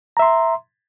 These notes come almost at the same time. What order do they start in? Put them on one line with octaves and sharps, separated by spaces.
A#5 E5 C6